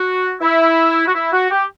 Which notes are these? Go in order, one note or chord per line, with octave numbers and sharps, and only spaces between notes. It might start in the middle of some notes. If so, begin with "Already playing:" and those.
Already playing: F#4
E4
F#4
E4
F#4
G4